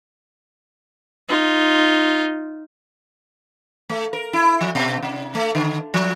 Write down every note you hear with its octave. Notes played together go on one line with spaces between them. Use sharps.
D#4 F4
A3
A#4
E4
F3
B2
C3
A3
D3
F3